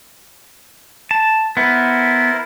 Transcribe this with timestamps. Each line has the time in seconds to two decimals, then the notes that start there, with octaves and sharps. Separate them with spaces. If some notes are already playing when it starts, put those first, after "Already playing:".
1.11 A5
1.57 B3 E4 A#4 C5